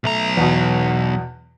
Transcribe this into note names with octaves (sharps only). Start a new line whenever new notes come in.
B1 A3 A#5
E2 B2